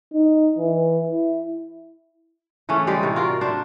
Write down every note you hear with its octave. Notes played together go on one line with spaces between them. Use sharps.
D#4
E3
E4
C#3 E3 A3 C#4
G3 G#3 G4 D5
A2 C3 A#4
F4 F#4 A#4 D5
A3 D4 C5